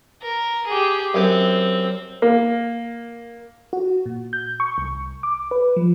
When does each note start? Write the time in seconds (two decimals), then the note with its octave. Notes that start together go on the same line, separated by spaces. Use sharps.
0.22 A#4
0.66 G4 G#4
1.14 F#2 C4 G4
2.22 A#3
3.73 F#4
4.06 A#2
4.33 G6
4.60 C#6
4.78 C2
5.23 D6
5.51 B4
5.76 F3